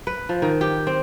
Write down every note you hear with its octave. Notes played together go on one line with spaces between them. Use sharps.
B4
F3
D#3
G4
C4